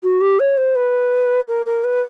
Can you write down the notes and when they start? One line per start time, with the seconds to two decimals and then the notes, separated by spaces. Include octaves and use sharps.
0.03 F#4
0.21 G4
0.40 C#5
0.57 C5
0.75 B4
1.48 A#4
1.66 A#4
1.84 B4